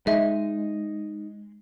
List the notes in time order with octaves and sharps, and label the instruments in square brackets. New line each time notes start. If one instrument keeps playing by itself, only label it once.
[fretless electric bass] G#3 [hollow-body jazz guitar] D#4 [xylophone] E5